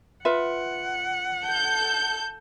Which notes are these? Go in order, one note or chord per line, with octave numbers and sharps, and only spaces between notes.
F4 B4 E5 F#5
A4 G6